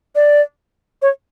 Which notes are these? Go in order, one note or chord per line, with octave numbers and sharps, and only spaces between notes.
D5
C#5